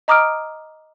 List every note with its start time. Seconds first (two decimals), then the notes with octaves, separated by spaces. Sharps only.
0.08 D#5 A#5 D6 D#6 F6 D7